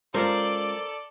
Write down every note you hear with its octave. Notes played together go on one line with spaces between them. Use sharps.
G#3 C#4 F4 A4 A#4 C5 D5